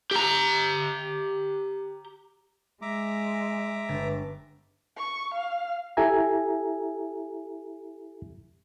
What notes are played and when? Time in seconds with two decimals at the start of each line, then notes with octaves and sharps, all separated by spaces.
0.11 G4 A#5
2.82 G#3 E5 A#5 D6
3.89 G1 A6
4.97 C#6
5.34 F5
5.97 E4 G4 A4 E5 G#5 A#5